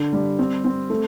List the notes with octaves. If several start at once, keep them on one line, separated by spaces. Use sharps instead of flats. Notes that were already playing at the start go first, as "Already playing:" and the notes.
Already playing: D3
G3
C4
C4
A3